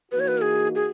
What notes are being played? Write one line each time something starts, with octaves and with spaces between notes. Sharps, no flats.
E3 A#3 D#4 F#4 B4
C#5
B4
A#4
G#4
G#4